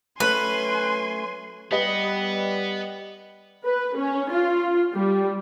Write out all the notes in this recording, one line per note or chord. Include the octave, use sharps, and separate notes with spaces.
F#3 A3 C#4 B4 G#5 C6
G3 B3 G4 B4 D#5
B4
C#4
F4
G3